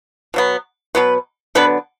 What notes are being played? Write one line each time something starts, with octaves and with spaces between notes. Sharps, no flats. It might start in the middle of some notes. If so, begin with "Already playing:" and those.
B2 F#3 B3
B2 F#3 B3 B4
D3 F#3 B3 D4 B4